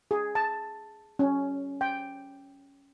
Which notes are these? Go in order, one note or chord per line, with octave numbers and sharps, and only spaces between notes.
G#4
A5
C#4
G5